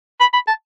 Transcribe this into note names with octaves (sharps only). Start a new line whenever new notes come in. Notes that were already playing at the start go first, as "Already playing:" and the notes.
B5
B5
A5